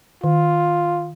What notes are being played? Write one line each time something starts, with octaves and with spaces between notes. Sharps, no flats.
D#3 F4